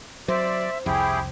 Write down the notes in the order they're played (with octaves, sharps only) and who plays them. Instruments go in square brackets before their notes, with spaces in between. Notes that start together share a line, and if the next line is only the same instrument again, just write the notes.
[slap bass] F#3 [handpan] C5 [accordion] D5 [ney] E5
[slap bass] C2 F2 [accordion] E4 G4 G#4 [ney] G5